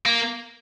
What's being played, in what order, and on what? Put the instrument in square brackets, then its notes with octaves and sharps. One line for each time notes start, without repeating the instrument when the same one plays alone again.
[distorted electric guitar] A#3